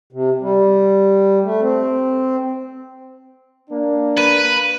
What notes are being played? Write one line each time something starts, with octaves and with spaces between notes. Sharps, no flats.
C3
G3
A3
C4
A#3 D4
B4 D#7